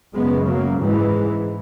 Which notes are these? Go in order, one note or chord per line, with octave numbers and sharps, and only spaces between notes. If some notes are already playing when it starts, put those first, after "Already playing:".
F#2 C#3 G#3 B3
F#3 A#3
G#2 E3 G#3